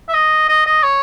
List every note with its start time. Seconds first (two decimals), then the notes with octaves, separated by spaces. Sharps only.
0.09 E5
0.13 D#5
0.49 D#5
0.66 D#5
0.83 C#5